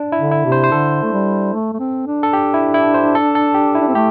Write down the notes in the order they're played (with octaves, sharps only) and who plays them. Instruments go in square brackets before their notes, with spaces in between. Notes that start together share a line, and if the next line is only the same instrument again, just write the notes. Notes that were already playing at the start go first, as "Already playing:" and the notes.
Already playing: [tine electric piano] D4
E4
[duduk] D3
[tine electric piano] E4
[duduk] C3
[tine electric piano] C5
C5
[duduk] D3 [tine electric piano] A4
[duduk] A3
G3
A3
A3
C4
D4
[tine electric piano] A4
G4
E4
E4
C5
A4
A4
G4
E4
[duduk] D4
C4
[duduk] A3 [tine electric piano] G4